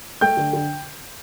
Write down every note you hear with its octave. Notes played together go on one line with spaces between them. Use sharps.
A3 G5 G6
D3
D3